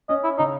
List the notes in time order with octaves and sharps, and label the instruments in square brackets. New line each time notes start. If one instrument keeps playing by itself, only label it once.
[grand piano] C#4 [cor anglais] D#5
[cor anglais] E4
[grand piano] C#3 [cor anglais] D#4